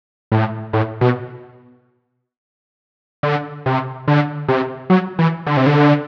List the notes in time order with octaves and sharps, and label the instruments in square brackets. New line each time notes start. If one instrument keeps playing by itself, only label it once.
[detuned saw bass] A2
A2
B2
D3
C3
D3
C3
F#3
E3
D3
C3
D3